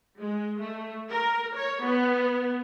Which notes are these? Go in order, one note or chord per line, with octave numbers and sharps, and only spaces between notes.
G#3
A3
A#4
C#5
B3